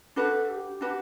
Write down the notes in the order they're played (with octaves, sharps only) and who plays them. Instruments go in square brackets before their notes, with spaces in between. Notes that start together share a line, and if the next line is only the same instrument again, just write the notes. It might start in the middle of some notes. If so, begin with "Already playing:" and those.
[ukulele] D4 F#4 B4 [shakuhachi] A4
[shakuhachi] G4
[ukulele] D4 F#4 B4